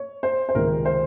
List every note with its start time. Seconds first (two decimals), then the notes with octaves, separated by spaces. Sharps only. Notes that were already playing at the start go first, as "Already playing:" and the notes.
Already playing: C#5
0.23 C5
0.49 C5
0.55 C#2 C3 D#3 G#3 A#4
0.85 C5